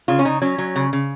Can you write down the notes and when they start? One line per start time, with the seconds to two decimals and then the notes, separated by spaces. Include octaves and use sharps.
0.08 C#3 F4
0.19 C#4
0.25 C#3 D#4
0.42 F#3 C#4
0.58 F#3
0.76 C#3
0.93 C#3